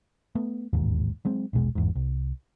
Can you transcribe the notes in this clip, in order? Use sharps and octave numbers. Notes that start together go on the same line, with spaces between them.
A3 B3
E1 A1 D#2 G#2
F#3 G#3 C4
A#1 E2 B2 G#3
G1 E2 G#2
C2